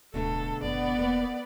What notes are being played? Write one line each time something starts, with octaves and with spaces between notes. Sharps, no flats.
D1 B2 D3 A3 A4
F#1 B3 D5
E1 A#3 C4